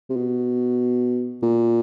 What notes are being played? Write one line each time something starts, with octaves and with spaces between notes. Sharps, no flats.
C3
B2
A#2